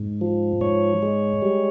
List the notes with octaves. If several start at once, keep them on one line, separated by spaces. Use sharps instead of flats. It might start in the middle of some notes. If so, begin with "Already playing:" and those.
Already playing: G#2
F3
G#2 C#5
G#3
G3